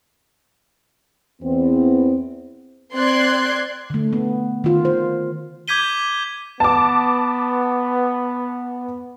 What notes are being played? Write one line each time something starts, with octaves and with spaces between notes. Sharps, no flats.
E2 B3 C4
C4 D5 C6 F#6 G#6
D3 A3
B3
D#3 F4
C5
D6 G6 G#6 B6 D#7 G7
B3 A5 D6